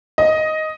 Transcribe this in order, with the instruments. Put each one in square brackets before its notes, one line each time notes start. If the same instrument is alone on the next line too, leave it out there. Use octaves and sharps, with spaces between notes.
[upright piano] D#5